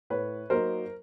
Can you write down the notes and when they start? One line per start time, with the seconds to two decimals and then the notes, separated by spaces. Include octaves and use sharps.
0.10 A2 B4 C#5
0.50 F#3 A#3 D#4 A#4 C5